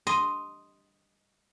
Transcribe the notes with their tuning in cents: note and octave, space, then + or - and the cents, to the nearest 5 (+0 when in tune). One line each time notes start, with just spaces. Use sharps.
D#5 +0 C6 +0